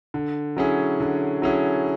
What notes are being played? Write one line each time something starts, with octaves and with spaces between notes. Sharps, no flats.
D3
F#3 C#4 E4 G#4
D3
F#3 C#4 E4 G#4